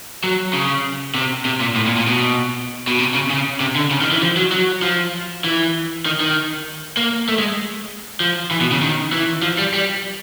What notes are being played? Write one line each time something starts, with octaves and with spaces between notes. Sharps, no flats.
F#3
C#3
C3
C3
A#2
A2
A#2
A#2
B2
B2
C3
C#3
C#3
C3
D3
C#3
D#3
E3
F3
F#3
F#3
F3
E3
D#3
D#3
A#3
A3
G#3
F3
E3
B2
C#3
D#3
E3
F3
G3
G3